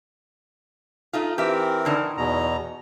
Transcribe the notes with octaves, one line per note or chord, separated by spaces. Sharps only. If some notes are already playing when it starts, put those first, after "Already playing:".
A3 D#4 F4
E3 C4 G4 A#4 E5
A2 D3 D#4
E2 B2 A#5